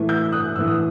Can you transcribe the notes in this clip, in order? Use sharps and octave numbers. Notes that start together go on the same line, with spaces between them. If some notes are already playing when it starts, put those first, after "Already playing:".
Already playing: A2 E3 A3
E6 G6
D#6 F#6
A2 E3 A3 E6
D#6